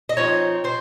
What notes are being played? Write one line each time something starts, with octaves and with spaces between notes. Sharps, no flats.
D#5
F3 C4 D#4 C#5
C4 C5